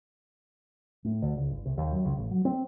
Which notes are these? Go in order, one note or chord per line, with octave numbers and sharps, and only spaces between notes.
A2
D2
C#2
G1
C2
D#2
F#2
C#2
A1
F#3
C4